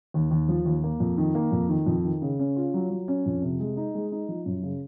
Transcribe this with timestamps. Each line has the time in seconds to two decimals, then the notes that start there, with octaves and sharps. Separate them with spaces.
0.14 D#2
0.31 D#2
0.49 F3
0.65 D#2
0.84 A#3
1.00 F2
1.18 D#3
1.35 A#3
1.52 F2
1.69 D#3
1.86 F2
2.05 D#3
2.22 C#3
2.40 C#4
2.56 F4
2.74 F#3
2.90 F#3
3.08 C#4
3.26 F2
3.42 C3
3.60 G#3
3.77 D#4
3.95 G#3
4.12 D#4
4.29 F3
4.46 F#2
4.63 C#3